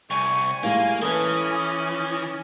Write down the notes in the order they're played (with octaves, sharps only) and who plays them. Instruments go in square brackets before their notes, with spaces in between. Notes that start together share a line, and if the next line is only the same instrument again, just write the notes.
[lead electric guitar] C2 [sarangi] G#5 [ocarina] C#6
[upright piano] A2 G3 G#3 [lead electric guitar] A#3 [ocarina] F5
[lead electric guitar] E3 [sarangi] C#4 [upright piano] A4 B4 [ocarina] D#6